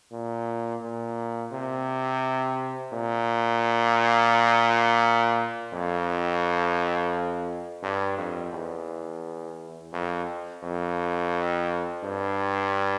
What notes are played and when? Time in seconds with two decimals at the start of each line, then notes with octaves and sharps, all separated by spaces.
0.12 A#2
0.82 A#2
1.52 C3
2.93 A#2
5.73 F2
7.83 G2
8.17 F2
8.53 E2
9.93 F2
10.63 F2
12.04 G2